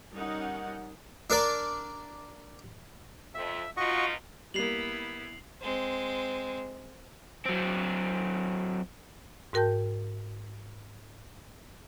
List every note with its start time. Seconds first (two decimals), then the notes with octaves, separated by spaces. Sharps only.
0.12 G3 C#4 D#4 A#4 F#5
1.30 D4 A#4 D5
3.34 F2 E5
3.77 B2 D#4 F4 F#4 D#5 C#6
4.54 G3 A#3 B3 E4 C7 F7 F#7
5.61 G#3 C4
7.45 F#3 C4
9.53 G#2 F#4 A#4 G5 A5 G6